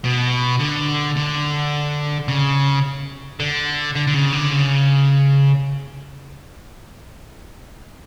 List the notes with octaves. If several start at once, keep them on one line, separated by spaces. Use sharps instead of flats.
B2
D3
D3
C#3
D3
D3
D3
C#3
D3
C#3